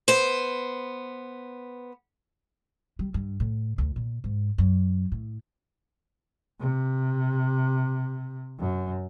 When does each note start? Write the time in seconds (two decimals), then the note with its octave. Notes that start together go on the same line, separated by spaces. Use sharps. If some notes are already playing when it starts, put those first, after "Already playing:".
0.08 B3 C5
2.99 G3
3.14 G2
3.40 A2
3.78 D2
3.96 A#2
4.24 G#2
4.58 F#2
5.12 A2
6.60 C3
8.59 F#2